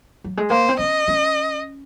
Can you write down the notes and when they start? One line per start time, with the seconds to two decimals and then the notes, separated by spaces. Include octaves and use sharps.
0.24 F#3
0.37 G#3
0.50 A#3 C5
0.69 C4
0.79 C#4 D#5
1.08 C#4